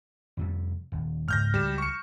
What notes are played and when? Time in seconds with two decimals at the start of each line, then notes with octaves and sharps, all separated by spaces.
0.37 F2 C3 G3
0.92 D#1
1.28 C#2 G#2 F6 G6 A#6
1.54 C#2 F#3 G3 E7
1.78 C#6 C#7